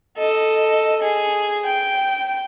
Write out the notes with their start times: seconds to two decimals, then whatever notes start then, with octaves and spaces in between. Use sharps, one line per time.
0.18 A4 D#5
1.02 G#4
1.65 G5